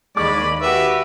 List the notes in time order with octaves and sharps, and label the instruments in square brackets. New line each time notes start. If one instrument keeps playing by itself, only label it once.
[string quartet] D#2 B5 [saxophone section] G#3 [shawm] D5 [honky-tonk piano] C#6 D6
[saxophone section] F#4 B4 [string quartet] G4 [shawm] E5